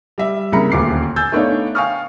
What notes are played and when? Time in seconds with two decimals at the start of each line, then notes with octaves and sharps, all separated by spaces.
0.18 G3 E5
0.52 C2 C#3 A#3 A#5 B5 C#7
0.72 D#1 D2 D6 C7
1.16 G#5 E6 G6 A6
1.32 A3 B3 D4 D#4 C#5 F5
1.75 F5 G5 G#5 C#6 D#6 F6